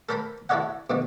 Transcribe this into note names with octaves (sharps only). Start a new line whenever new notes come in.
A4 A#4 C5 A#5 B5
E4 F#4 A4 C#5 D#5 F#5
B2 D3 D#4